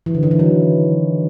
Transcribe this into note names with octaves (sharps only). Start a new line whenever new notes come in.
E3
D3
D#3
E3
F#3